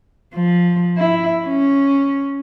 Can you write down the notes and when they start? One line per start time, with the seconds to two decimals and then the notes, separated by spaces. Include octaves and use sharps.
0.34 F3
0.97 E4
1.47 C#4